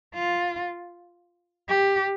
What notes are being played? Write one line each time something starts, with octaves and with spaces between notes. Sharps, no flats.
F4
G4